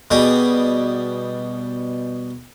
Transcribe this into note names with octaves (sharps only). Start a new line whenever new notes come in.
B2 G3 G#4